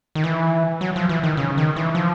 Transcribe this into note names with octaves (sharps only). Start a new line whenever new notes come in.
D#3
E3
F#3
F3
E3
D#3
C#3
D#3
E3
F3